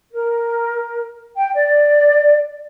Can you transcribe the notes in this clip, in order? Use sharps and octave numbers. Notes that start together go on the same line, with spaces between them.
A#4
G5
D5